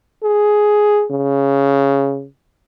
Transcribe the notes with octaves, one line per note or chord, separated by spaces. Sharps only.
G#4
C#3